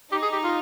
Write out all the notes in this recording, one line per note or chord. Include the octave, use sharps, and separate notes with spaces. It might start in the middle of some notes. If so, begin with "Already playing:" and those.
D#4 G4
G#4
G4
F4